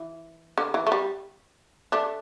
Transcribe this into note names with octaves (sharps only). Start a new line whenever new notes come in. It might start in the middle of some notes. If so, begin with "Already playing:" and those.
Already playing: E3
D3
E3
A3
G3
A3 D4